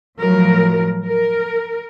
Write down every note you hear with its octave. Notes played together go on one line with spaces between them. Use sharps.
A2 F3 F#3 A#4
A#4